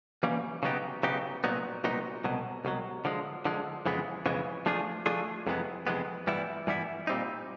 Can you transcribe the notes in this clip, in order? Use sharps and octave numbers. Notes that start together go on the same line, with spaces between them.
E3 G3 A#3 C#4
C#3 F#3 B3 D#4 G4
C#3 F#3 B3 D#4 G4
C2 A#2 F#3 B3 D#4
C2 A#2 F#3 B3 D#4
C2 B2 F#3
C2 B2 F#3
D3 F3 G#3
D3 F3 G#3
F2 C#3 E3 G#3 B3
F2 C#3 E3 G#3 B3
F3 A3 D4 F4 G#4
F3 A3 D4 F4 G#4
F2 C3 E3 G#3 B3
F2 C3 E3 G#3 B3
G2 E3 G3 B3 E4
G2 E3 G3 B3 E4
A#2 G3 C4 D#4